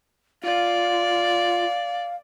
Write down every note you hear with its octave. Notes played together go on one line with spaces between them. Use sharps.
F4 D5 F5